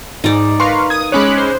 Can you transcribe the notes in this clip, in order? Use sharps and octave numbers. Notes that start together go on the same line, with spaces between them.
G#2 D#4 D5
A#4 B4 F5 C6 C#6
D#6 G#6
G#3 C#4 C#5 B5 D6 F#6
C5